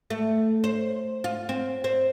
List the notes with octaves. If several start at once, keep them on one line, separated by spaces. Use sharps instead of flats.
A3
C5
F4
C4
C4